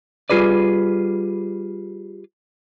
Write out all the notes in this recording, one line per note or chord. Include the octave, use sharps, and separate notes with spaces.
G3 F4 G#4 B4 D5